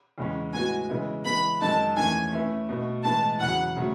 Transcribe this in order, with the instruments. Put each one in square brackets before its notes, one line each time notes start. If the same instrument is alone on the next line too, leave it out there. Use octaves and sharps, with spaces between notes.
[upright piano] E2 C#3 G#3 C#4
[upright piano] A2 G#3 B3 F#4 [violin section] G#5
[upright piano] C#3 E3 G#3 B3 E4
[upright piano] E3 G#3 B3 [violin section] B5
[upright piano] F#2 D#3 G#3 D#4 A4 [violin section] A5
[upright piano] E2 D#3 A3 C#4 [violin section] G#5
[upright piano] A3 C#4 E4 B4 E5
B2 A3 D#4
[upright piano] A2 E3 G#3 B3 D#4 [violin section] A5
[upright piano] E2 C#3 F#3 [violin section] F#5
[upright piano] C#3 F#3 A3